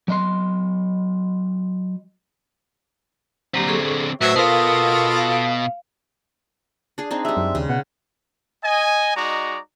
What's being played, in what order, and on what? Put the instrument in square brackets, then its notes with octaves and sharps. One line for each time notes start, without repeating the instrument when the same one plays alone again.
[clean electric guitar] F#3 D#5 C6
[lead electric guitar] D3 C4 [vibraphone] F#3 A#3 G4
[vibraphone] G#4 A4 C#6
[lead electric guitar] A2 [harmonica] F#3 E5 [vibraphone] B4 C5
[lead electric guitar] B2 B3 [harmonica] F4 A4 D#5 [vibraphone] A#4 F5
[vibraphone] F5
[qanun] D4 G#4
C4 D4 D#4
[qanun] G3 G#3 [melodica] E5
[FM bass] F#2
[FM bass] D#2 [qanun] C#3
[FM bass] B2 [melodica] F#5
[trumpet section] D#5 G#5
G#3 D#4 F#4 D5 A#5